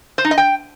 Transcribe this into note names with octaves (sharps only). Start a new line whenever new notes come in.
C5
D#4
D#5
G5